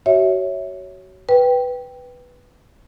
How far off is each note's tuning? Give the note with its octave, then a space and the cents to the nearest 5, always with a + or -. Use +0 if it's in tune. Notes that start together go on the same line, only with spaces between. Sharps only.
F#4 +30 C#5 +0 E5 -15
B4 +0 G5 +0